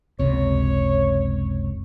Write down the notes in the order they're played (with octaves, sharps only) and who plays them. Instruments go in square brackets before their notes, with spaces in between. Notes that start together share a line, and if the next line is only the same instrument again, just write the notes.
[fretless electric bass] F#1 C#2 C3 [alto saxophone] C#5